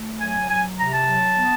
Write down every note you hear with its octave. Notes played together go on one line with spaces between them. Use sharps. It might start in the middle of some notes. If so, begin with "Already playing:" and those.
Already playing: A3
F#3 G#5
F#3 G#5
C3 A#5
A5
F#3
B3